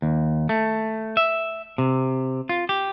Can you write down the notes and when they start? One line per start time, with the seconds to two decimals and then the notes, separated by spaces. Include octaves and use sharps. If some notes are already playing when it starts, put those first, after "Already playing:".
0.02 D#2
0.49 A3
1.17 E5
1.78 C3
2.49 F4
2.69 G4